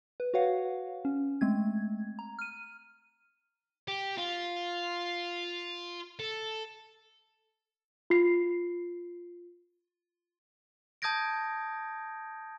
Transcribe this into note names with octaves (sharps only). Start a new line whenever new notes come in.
B4
F#4 B4 C#5 F5 F#5
C#4
G#3 A3 C4 G#6
A#5
F6 D#7
G4
F4
A4
F4 C7
A5 D#6 G6 G#6 A#6 D7